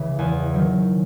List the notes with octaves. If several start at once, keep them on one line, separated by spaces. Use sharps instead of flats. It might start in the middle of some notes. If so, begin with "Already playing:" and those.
Already playing: C#2 C#3 E3
E2 G#5
D#3 F#3